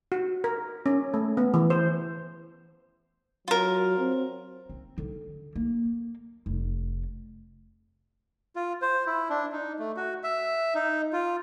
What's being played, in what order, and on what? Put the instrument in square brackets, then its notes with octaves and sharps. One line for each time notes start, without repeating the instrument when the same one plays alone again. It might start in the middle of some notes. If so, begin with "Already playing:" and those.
[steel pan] F#4
A#4
C#4
A3
B3
E3
C5
[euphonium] F#3 [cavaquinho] F4 A#4
[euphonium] C4
[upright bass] C4
D3
A#3
F1
[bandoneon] F4
C5
E4
D4
D#4
A3
F#4
E5
D#4
F4